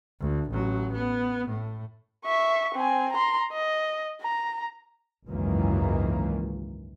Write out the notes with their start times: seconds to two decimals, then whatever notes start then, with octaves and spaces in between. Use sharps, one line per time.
0.21 D2
0.51 A1 F#3
0.93 B3
1.48 A2
2.26 E5 C#6
2.75 C4 G#5
3.13 A#5 C6
3.53 D#5
4.22 A#5
5.27 G#1 C#2 F#2 D#3 E3 A#3